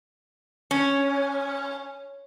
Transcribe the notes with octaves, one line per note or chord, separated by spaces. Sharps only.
C#4